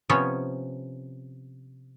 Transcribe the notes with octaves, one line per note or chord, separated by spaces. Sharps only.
C3 F3 B3 C#4 C#5